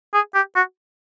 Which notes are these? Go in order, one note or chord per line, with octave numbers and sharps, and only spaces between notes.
G#4
G4
F#4